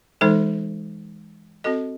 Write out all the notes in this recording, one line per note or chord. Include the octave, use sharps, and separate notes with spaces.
E3 G#3 D#4 A4 C5
C4 F#4 A4 D#5